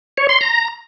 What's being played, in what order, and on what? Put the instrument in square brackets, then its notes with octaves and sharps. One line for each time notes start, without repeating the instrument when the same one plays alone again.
[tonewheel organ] C#5
C6
A#5